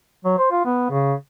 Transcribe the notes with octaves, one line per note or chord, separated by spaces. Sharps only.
F#3
C5
F4
B3
C#3